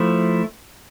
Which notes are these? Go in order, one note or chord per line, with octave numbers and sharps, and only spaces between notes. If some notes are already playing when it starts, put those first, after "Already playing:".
Already playing: F3 A3 E4